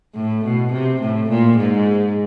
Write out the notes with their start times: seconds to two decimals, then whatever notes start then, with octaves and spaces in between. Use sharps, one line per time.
0.15 A2
0.44 B2
0.72 C3
1.01 A2
1.29 A#2
1.58 G#2